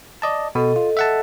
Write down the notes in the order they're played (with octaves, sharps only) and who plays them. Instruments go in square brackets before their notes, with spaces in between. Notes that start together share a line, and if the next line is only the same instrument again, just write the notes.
[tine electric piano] D5 D#5 A5
[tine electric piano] B2 [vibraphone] A4 D#5
[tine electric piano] F4
E5 F#5 A5